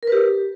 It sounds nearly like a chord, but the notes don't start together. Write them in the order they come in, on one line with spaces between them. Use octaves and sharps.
A#4 B4 G4